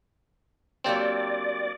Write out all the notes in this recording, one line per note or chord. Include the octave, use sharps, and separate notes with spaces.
F#3 A#3 C4 D4 G4 D5